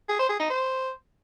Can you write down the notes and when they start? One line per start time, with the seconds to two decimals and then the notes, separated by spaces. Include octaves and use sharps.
0.09 G#4
0.19 C5
0.29 G#4
0.40 D#4
0.50 C5